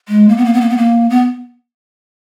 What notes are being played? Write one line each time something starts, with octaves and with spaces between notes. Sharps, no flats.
G#3
A#3
B3
A#3
B3
A#3
B3
A#3
B3